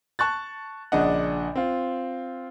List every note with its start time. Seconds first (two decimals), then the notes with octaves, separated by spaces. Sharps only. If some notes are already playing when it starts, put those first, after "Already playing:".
0.19 A5 C#6 F#6 A6
0.92 A#1 C#3 D4 D#5 F#5
1.56 C4 F4